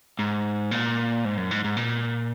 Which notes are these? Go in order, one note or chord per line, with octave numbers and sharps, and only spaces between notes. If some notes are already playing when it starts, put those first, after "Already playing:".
G#2
A#2
G#2
F#2
G#2
G#2
A#2